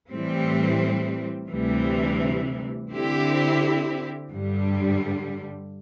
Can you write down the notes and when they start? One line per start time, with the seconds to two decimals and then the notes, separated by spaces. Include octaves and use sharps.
0.10 A2 E3 G3 C4
1.49 D2 C3 E3 G3
2.90 D3 C4 E4 G4
4.30 G2 D3 G3